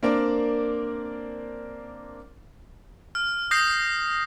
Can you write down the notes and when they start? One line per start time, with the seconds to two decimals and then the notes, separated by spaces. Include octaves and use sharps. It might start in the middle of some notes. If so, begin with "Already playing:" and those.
0.03 A#3 C4 D4 A#4 D5
3.15 F6
3.51 D#6 G6 A#6 C7